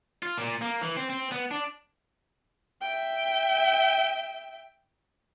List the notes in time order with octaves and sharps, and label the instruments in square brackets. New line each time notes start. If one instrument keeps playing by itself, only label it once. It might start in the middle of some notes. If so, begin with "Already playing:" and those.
[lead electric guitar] F4
A#2
A#3
E3
C4
C4
B3
D4
[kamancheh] E5 G5